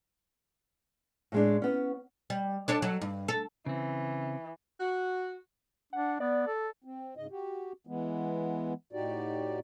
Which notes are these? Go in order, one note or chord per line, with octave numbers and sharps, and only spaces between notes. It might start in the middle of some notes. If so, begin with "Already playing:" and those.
A2 G#3 D4
B3 C#4
G3
D4 A4 C#5
F#3 A4
G2
A4
C#3 E3 C4
F#4
D4 F#5
B3 D5
A4
C4
G#2 C#3 D#5
F#4 G4
E3 G#3 B3
A2 D#4 F#4 G4 D5